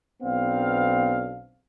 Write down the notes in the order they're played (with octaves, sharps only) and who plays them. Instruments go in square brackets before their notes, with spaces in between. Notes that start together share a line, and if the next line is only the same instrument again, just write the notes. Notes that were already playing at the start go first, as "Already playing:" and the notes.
[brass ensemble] B1 B3 C4 D4 F5